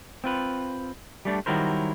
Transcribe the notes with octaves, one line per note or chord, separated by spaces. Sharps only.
C4 F4 B4
G3 A3 D4
D#3 F#3 G3 E4 A#4 C5